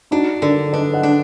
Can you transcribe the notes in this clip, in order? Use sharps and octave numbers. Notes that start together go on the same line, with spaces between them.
D4 D#4 F#4
D3 A#4 D5
D5
D4 B4 D#5
D#5 F#5
D4